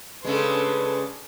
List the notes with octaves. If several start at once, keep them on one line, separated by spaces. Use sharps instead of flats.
C#3 G#3 D4 A4 B4 C6